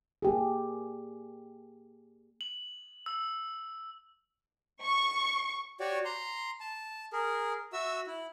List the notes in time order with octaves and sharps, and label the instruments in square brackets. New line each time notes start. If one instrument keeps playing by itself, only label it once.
[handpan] A#3 G4 G#4
[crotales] F#7
E6
[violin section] C#6
[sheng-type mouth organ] F#4 G4 C#5 D5
A#5 C6
A5
G#4 A#4
F#4 E5 E6
E4